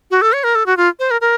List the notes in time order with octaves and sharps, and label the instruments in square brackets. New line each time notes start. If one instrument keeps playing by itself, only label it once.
[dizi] F#4
A4
C#5
A#4
A4
F#4
F4
C5
A#4
A#4